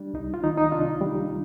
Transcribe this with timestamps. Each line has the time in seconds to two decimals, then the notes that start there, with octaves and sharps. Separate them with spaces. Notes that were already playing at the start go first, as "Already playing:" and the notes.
Already playing: G3 D4
0.14 C2 D#4
0.34 F4
0.43 D#3 D#4
0.58 D#4
0.72 C3 D4 F4
1.01 G3